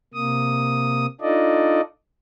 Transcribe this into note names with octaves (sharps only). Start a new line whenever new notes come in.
C3 A#3 D#6
D4 D#4 F4 A4 D5 D#5